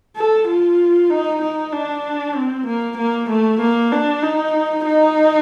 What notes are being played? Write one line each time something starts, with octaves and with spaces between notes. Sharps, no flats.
A4
F4
D#4
D#4
D4
C4
A#3
A#3
A3
A#3
D4
D#4
D#4